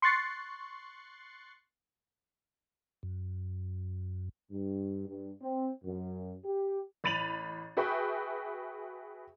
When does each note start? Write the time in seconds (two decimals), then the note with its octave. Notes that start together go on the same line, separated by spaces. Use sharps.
0.02 C6 C#6 F#6 A6 C7 C#7
3.03 F#2
4.51 G2
5.07 G2
5.41 C4
5.84 F#2
6.45 G4
7.04 A1 B5 A6 D#7 F7 F#7
7.77 F#4 G#4 B4 E5 G5 C#6